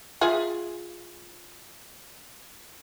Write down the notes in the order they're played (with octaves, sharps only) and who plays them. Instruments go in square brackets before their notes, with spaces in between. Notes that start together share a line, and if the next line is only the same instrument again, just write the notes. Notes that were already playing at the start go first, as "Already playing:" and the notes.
[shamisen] F4 G#4 E5